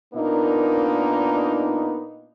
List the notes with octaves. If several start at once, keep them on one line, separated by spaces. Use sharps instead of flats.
A#2 A#3 B3 D4 D#4